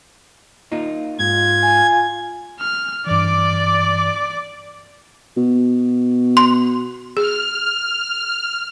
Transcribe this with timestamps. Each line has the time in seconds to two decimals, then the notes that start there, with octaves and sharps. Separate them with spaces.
0.72 A#3 D#4 F4
1.19 G#2 F4 G#6
1.63 G#5
2.60 F6
3.07 G2 E3 D5 D6
5.37 B2
6.37 C6
7.17 G#4 F6